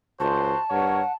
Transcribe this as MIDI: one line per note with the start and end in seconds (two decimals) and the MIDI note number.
0.20 0.53 37
0.20 0.60 66
0.20 0.60 72
0.20 1.15 81
0.70 1.01 43
0.70 1.03 70
0.70 1.03 73
0.70 1.12 78